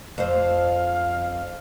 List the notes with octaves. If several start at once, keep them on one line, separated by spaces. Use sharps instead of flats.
F2 C5 F5